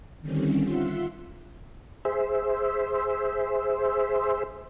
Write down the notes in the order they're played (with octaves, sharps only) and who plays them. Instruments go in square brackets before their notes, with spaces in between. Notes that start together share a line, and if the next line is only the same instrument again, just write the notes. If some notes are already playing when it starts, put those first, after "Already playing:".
[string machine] D3 D#3 G3 C4 C#4
F4 E5 F#5 C6 E6
[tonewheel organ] G#4 C5 E5